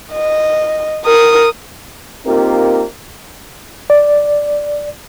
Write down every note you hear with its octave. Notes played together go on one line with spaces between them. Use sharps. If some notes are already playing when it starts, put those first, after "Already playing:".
D#5
A#4 D#6
A#3 C4 D#4 F4 G4 A#4
D5